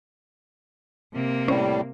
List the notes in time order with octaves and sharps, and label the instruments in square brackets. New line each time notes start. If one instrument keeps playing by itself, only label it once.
[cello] C3 A#3
[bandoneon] A2 G3 [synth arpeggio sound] C#4 C5